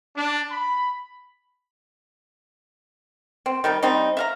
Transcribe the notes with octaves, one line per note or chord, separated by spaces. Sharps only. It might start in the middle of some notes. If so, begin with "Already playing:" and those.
D4
B5
C4
D#3 G3 D#4
G3 C4 D#4
E5 F5 A#5